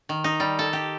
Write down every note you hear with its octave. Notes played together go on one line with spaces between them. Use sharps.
D#3
D#4
G3
A4
G4